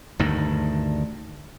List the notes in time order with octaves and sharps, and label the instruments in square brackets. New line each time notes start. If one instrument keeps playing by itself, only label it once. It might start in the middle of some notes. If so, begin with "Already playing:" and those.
[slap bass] D2 G2 D#3